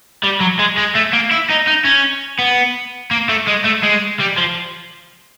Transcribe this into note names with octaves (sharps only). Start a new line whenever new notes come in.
G3
F#3
G#3
G#3
A3
A#3
E4
D#4
D#4
C#4
B3
A#3
A3
G#3
A3
G#3
G3
F3